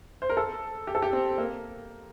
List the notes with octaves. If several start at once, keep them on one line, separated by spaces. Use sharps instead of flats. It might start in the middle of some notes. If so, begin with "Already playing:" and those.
C5
A#4
A4
G4
A4
G4
C4
A#3